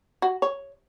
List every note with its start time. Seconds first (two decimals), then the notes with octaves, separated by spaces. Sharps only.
0.22 F#4
0.42 C#5